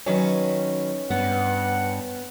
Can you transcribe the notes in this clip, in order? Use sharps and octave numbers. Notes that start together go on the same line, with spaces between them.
D#3 F#3 C#4 B4
G2 B3 F#5